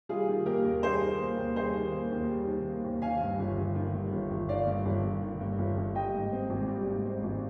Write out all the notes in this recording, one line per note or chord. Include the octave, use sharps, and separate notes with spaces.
G3 F4 G#4
D#3
A#3 G4 A#4
D#2
G3 G#4 C5
D#3
A#3
D#2
G3 G#4 C5
D#3
A#3
D#2
G3
D#3
A#3
D#2
D#3 F5 G#5
G2
G1
G1
D#3
G2
G1
G1
D#3 D5 F5
G2
G1
G1
D#3
G2
G1
G1
G3 D#5 G5
G#2
C4
G#1
G3
G#2
C4
G#1